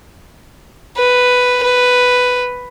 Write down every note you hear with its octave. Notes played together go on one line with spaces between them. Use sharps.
B4
B4